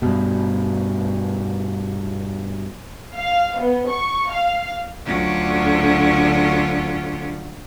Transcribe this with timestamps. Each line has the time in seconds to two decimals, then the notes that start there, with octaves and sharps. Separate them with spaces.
0.02 G2 B2
3.15 F5
3.60 B3
3.89 C#6
4.33 F5
5.04 D2 D3 F#3 C#4 F4 F#5